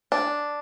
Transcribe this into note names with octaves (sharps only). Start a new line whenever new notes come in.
D4